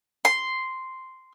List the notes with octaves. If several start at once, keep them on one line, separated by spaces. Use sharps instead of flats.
C6